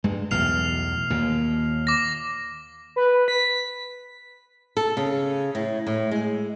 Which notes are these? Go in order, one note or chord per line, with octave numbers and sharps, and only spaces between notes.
G2 G#3
B1 E2 A2 F6 C7 F7
D#2 A#2
D6 A#6
B4
B6
A4
C#3
A2
A2
G#3